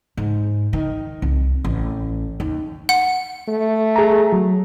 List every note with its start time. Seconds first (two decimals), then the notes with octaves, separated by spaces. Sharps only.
0.17 G#2
0.73 D#3
1.22 C2
1.65 A1
2.40 D#2
2.89 F#5
3.48 A3
3.96 G#4 A#5
4.32 F#3